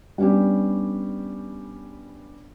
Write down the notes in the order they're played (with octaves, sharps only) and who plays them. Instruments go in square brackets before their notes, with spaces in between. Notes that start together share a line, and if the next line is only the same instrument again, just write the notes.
[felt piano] G3 B3 C#4 D4 G4